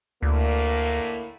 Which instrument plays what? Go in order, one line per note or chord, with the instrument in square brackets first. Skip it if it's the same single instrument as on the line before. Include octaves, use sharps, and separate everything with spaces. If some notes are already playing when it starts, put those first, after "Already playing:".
[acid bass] D2 [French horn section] A2 D3 A#3